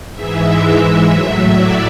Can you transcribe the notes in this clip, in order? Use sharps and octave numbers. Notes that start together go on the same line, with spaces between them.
G#2 E3 G#3 E5
A2 F#3
D5